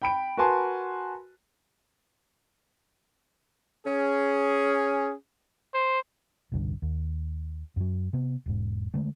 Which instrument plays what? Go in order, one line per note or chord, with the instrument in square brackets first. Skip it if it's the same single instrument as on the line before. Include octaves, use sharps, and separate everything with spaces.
[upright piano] G5 B5 D7
F#4 A#4 B4 G#5 A5 C6
[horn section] C#4 G#4
[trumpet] C5
[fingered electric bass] E1 C2 G2 D3
D#2
F#2 F#3
C3 B3
E1 G#2
D3 G#3 A3